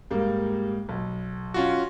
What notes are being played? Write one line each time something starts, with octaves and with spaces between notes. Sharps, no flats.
G#2 G3 A#3
B1
C#4 F4 F#4